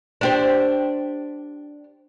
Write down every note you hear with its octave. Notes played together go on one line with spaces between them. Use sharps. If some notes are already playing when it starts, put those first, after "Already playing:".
D4 G4 C5